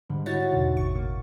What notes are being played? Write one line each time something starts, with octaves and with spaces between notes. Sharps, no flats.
G#2 D3 G3
D#4 E4 F#4 C#5 F#5 A6
E2 G#2 B2 D3
G#1 A2 C#6
A#3